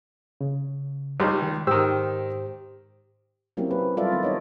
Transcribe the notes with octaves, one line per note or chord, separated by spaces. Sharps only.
C#3
C#2 G3 G#3 D#4 C6
D#3
G#2 D#3 G4 C5 E6
F#3 A#3 C4 C#4 E4 G4
B4
F#3 G3 F4 A4 D5 E5
D#3 B3 C4
D#4 C#5 D#5